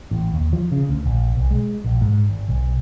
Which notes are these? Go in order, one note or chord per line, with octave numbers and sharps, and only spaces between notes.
A1
D#2
F3
C#3
D2
A#1
B1
G#3
A#1
G#2
G#1
B1